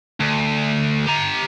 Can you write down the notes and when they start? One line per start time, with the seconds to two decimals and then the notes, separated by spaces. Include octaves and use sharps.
0.20 D2
1.07 G4 A#5